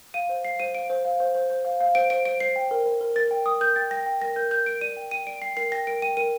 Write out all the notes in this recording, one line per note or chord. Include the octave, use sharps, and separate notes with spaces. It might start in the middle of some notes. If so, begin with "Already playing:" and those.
F5 D#7
C5
F5 C7
C5 D#7
F5 D7
C5
F5
C5
C5
C5
F5
F5
C5 D7
C5 D7
C5 D7
C5 C7
G5
A#4
A#4
A#4
A#4 A6
G5
A#4 D#6
A#4 G6
G5 A6
G5 A#6
G5
A#4 A#6
A#4 G6
A#4 G6
A#4 D7
D5 D#7
G5
G5 D#7
D5 D7
G5 C7
A#4 C7
G5 A#6
A#4 D7
G5 D#7
A#4 D#7